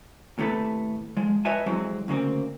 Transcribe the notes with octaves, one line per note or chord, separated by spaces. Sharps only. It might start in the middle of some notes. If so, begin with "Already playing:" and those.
D#2 A2 C3 A3 A4 B4
F3 G#3
B4 C#5 D#5 E5 G#5 A5
F2 C3 E3 F#3 G#3 C4
D2 C#3 A#3 C4